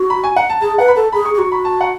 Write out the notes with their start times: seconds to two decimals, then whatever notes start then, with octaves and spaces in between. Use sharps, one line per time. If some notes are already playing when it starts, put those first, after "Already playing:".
Already playing: F#4
0.10 B5
0.24 G#5
0.36 F#5
0.49 A5
0.62 G#4 A5
0.78 B4 F#5
0.88 B5
0.96 A4 A5
1.12 G#4 B5
1.25 C#6
1.34 G#4
1.38 F#4 C#6
1.52 B5
1.65 A5
1.81 F#5